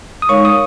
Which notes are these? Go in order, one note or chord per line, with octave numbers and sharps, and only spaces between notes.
D#6
G#3 D#4 A#4 C#5 F5 C#6
D#6